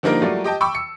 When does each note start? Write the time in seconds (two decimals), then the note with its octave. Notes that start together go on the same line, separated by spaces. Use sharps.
0.03 D3 F3 G3 A#3 D#4 A#4
0.22 F#3 G3 A3 F4 A#4 D5
0.44 G4 D#5 G5 A5
0.61 G5 B5 C#6 D6 E6
0.75 C#7